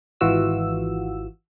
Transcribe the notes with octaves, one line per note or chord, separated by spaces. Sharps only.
G#1 E3 F4 F#4 E6